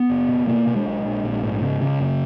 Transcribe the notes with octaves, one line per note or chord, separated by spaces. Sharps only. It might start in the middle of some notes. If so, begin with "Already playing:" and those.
Already playing: B3
F#1
B2
B2 A#3
B2
G#3
B1
A#1
A#1
G#2
C#3
C#3
F#1